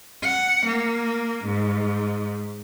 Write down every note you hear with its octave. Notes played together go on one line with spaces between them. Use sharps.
F#5
A#3
G#2